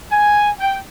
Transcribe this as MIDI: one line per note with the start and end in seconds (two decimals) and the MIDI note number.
0.12 0.51 80
0.60 0.78 79